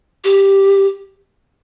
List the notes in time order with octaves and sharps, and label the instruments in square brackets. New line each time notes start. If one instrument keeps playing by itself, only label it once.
[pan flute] G4